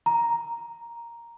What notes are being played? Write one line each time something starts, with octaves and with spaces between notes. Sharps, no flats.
A#5